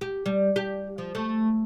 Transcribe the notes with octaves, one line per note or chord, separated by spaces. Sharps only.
G4
G3
G4
F3
A3